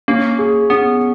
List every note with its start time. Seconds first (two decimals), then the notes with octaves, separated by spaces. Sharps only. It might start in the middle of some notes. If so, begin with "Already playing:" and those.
0.08 A#3 C#4
0.39 G#4
0.70 B3 C#4